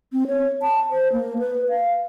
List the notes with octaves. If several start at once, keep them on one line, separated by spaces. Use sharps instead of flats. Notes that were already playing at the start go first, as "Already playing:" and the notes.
C4
C#5
A5
C5
A#3
B4
F5